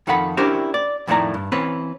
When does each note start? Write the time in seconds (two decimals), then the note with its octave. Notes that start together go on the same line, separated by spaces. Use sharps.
0.07 F2 D#3 A4 F#5 B5
0.37 C#4 D4 E4 G4 A#4 C5
0.74 D5
1.07 F2 A2 D#3 E4 D5 A#5
1.34 G2
1.52 E3 C4 C#4 B4